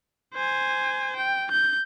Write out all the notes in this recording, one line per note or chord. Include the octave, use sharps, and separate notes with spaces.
C5 G#5
G5
G6